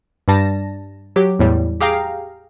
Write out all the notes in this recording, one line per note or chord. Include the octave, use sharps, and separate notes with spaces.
G2 G3 A5 A#6
F#3 G4
E2 A2 G3
G4 G#4 F5 G5 A#5